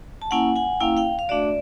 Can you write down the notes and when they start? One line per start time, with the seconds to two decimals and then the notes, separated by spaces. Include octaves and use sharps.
0.22 A5
0.31 A#3 C#4 E4 F#5 G#5
0.56 F#5 G#5
0.80 A#3 C#4 E4 F5 G5
0.97 F5 G5
1.19 F5
1.29 A3 D4 F#4 D5 E5